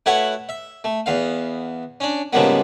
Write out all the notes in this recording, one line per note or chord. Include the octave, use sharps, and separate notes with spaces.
A3 E4 F#4 B4 C#5 F#5
E5
A3
E2 B3 F5
C#4 D4
G#2 C#3 F3 G3 A#3 B3